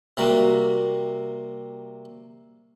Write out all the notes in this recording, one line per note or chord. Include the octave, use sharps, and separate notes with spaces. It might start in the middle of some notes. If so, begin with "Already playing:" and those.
C3 G3 A#3 F#4